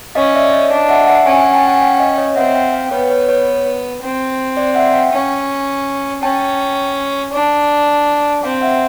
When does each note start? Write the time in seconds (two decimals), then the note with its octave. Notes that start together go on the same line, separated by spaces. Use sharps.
0.15 C#4 D#5 F5
0.35 D5 E5
0.53 C#5 D#5
0.71 D4 D#5 F5
0.89 E5 F#5
1.07 E5 F#5
1.26 C#4 F#5 G#5
1.40 F#5 G#5
1.53 G5 A5
1.67 F#5 G#5
1.82 F5 G5
2.00 D#5 F5
2.18 C#5 D#5
2.36 C4 E5 F#5
2.55 F5 G5
2.73 F5 G5
2.91 B3 B4 C#5
3.10 B4 C#5
3.28 B4 C#5
4.02 C4
4.57 C5 D5
4.75 E5 F#5
4.93 F5 G5
5.12 C#4
6.23 C#4 G5 A5
7.33 D4
8.43 C4 F5 G5
8.61 E5 F#5